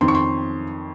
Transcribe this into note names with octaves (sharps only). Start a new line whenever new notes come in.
F2 D#3 C6
C#6
C6